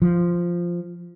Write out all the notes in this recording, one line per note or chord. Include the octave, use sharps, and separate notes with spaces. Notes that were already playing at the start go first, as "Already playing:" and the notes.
F3